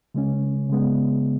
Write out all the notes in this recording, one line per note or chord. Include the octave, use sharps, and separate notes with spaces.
C#3 G#3 C#4
C#3 G#3 B3